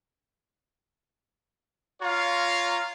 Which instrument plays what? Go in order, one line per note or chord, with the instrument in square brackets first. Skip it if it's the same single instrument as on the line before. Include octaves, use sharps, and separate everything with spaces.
[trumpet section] F4 C#5 F5 A#5